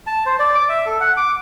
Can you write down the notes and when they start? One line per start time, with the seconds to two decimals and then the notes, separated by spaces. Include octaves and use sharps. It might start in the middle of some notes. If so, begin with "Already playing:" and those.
0.07 A5
0.26 C5
0.39 D5
0.55 D6
0.69 E5
0.86 A4
1.00 F#5
1.17 D6